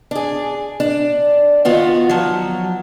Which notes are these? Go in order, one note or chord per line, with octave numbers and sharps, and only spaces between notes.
D4 G#4
D4
D#3 B3 F4 F#4
F3 F#3